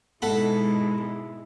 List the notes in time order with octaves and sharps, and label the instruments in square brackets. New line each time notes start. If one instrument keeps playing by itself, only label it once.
[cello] G#2 B2 [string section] G#3 [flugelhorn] E4 [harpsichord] A4 F#5 B5